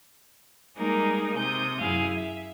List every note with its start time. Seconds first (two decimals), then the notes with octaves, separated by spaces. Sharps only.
0.77 G3 G#3 A#3 D#4 G#4 A#4
1.35 C3 D#6 G6
1.80 F#2 E4 G#4 F5
2.16 E5